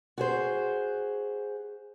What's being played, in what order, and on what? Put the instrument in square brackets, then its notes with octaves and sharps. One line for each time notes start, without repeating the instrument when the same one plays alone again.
[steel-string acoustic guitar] F#4 G#4 C5